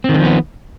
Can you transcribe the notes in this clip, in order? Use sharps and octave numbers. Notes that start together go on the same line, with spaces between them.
D3 D#3 F3 B3 C4